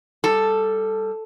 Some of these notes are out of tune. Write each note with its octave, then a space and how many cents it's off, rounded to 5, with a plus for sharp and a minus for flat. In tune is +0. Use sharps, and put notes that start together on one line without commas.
G3 +10 A4 +0